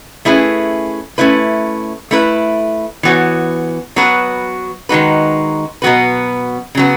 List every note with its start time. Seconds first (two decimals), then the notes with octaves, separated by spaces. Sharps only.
0.25 A3 C#4 E4 G#4 B4
1.18 A3 C#4 E4 B4
2.11 A3 E4 B4
3.03 E3 B3 F#4 C#5
3.96 F#3 B3 F#4 B4
4.89 D#3 G#3 D#4 F#4 B4
5.82 B2 F#3 B3 F#4 B4
6.75 C#3 F#3 B3